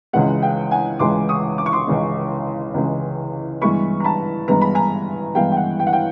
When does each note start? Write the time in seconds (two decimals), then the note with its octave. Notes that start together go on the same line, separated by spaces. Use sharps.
0.13 C#2 C#3 E3 G#3 F#5
0.42 F5 G5
0.71 F#5 G#5
0.99 C#2 C#3 E3 G#3 C6 D6
1.29 C#6 D#6
1.58 D6
1.66 C#6
1.73 C6 D6
1.87 C#2 C#3 E3 G#3
2.74 C#2 C#3 E3 G#3
3.61 G2 E3 G#3 B3 B5 C#6
4.00 A#5
4.04 A5 B5
4.48 G2 E3 G#3 B3 A#5
4.61 B5
4.75 G#5 A#5
5.35 G2 E3 G#3 B3 F5 G5
5.52 G5
5.57 F#5
5.80 G5
5.87 F#5
5.93 F5 G5